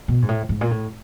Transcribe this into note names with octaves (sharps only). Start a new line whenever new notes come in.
B2
G#2
A2
G#2
A#2
A2